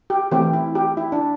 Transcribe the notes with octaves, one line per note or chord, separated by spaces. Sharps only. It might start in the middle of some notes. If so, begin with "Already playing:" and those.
G4
E3 A3 C4 G4
E4
G4
E4
D4